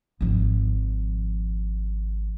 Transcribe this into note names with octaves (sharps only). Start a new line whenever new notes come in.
G#1 F3